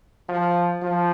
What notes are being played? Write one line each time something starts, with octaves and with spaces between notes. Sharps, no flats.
F3
F3